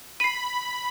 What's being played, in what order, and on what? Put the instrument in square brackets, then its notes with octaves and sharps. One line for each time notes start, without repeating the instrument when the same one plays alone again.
[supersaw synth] B5 [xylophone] C7 D#7